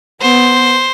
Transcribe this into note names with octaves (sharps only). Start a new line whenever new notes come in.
B3 C5